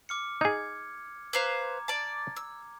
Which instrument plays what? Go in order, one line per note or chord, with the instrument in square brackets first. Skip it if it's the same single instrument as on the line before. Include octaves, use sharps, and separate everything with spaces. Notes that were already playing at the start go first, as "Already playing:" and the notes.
[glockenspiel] D6 F6 C#7
[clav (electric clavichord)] D#4 G#4 [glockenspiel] G#6
[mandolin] B4 C5 F5 [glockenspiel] A#5 D6 G#6
[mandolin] D5 A5
E6